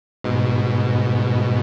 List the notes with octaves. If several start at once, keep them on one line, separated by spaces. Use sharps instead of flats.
G#2 B2